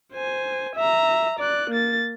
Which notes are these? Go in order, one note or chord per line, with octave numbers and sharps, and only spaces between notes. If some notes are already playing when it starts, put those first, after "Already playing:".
C5 G#5
E5 A#5
D5 F#6
A#3 A6